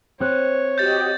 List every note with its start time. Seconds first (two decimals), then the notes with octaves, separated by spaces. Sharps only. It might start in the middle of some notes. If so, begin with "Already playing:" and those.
0.20 C4 C#5 F#6
0.78 F#4 G4 D#5 G6 A6